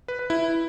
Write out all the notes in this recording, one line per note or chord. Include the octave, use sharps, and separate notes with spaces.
B4
B4
E4